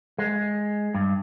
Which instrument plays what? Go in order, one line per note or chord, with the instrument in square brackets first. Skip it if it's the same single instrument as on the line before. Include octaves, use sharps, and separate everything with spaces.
[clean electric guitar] G#3
G2